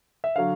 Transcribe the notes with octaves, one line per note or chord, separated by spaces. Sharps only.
E5
D3 F#3 F5